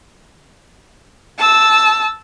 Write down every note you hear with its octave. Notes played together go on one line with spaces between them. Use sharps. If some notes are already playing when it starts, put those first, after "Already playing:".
A5 E6